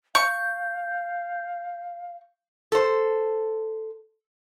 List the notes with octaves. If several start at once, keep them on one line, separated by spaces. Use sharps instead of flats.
F5 C#6 G6
A4 C5